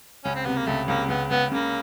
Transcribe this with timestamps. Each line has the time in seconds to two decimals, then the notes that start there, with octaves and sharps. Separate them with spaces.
0.24 C#2 C#4
0.36 C4
0.45 C3 B3
0.56 A#3
0.67 C#2 A3
0.88 C#2 A#3
1.08 C#2 B3
1.30 C#2 B3
1.51 C#3 A#3